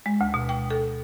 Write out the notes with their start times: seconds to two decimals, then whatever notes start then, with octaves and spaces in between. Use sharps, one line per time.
0.06 G#3
0.21 D2
0.34 B2
0.49 G5
0.70 A4